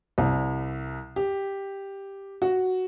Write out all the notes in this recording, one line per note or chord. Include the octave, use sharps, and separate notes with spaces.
C2
G4
F#4